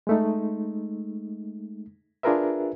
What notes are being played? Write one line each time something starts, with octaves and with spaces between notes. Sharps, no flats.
G#3 A3 D#4
D4 F4 G#4 A#4 B4 E5